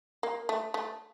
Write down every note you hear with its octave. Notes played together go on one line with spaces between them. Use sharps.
A#3
A3
A3